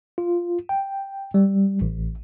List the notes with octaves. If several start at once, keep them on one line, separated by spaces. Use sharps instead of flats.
F4
G5
G3
A1